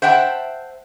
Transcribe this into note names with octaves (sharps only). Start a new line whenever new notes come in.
C5 E5 F#5 G5 A5